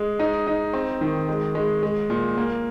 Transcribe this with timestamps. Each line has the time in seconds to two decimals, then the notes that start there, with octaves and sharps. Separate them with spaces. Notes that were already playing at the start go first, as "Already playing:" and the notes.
Already playing: G#3
0.19 D#4
0.47 D#4
0.73 C4
1.01 D#3
1.29 G#3
1.55 G#3
1.83 G#3
2.10 A#2
2.37 A#3